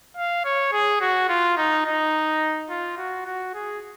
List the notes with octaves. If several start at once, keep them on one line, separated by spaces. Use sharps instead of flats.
F5
C#5
G#4
F#4
F4
D#4
D#4
F4
F#4
F#4
G#4